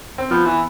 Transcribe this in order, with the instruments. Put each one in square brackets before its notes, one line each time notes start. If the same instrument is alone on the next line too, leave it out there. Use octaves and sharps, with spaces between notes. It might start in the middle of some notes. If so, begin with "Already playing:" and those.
[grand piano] C4
[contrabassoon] F3 [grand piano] B3
[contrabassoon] E3